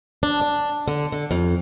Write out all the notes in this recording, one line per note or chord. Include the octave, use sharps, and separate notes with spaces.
D4
D4
D3
D3
F2